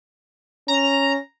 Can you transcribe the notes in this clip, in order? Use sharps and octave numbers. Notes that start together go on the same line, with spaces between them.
C#4 A#5